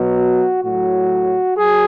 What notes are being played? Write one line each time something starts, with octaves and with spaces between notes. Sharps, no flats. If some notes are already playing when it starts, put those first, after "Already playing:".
Already playing: B2 F#3
F#4
A2 F#3 F#4
F#3 G#4